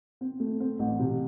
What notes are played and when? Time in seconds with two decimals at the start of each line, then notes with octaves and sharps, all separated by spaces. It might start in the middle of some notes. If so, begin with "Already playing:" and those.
0.21 C4
0.40 A3
0.60 C4
0.79 A1
0.99 C3